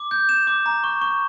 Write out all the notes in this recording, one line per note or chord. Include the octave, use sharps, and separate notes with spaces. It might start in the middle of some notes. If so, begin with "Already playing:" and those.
Already playing: D6
G6
E7
D6
A#5
C#6
C#6